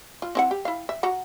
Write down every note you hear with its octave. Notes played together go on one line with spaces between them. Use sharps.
F4
C4 E4 F#5
G4
E4 F5
E5
F#4 F#5 A#5